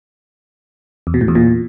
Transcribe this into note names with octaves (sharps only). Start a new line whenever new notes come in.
E2
B2
A2
E2
A#2